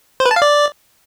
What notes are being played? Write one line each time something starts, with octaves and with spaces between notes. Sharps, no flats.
C5
B4
A5
F5
D5